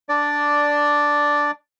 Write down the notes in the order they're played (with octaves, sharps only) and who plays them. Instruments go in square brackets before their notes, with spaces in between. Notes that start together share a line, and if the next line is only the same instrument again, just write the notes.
[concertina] D4 D5